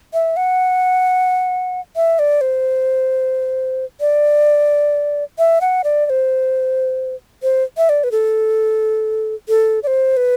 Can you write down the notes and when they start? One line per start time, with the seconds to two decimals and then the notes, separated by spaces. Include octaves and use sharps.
0.14 E5
0.37 F#5
1.96 E5
2.19 D5
2.41 C5
4.00 D5
5.38 E5
5.61 F#5
5.84 D5
6.06 D5
6.10 C5
7.43 C5
7.77 E5
7.89 D5
8.04 B4
8.12 A4
9.49 A4
9.83 D5
9.87 C5
10.17 B4